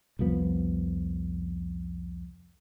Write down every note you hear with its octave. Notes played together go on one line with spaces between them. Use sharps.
C2 F2 F3 B3